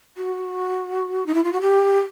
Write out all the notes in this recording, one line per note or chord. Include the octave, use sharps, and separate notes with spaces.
F#4
D#4
E4
F4
F#4
G4